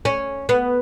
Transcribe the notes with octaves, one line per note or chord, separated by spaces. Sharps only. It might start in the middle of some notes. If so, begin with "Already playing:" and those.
C#4
B3